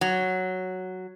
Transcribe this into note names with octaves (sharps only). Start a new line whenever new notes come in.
F#3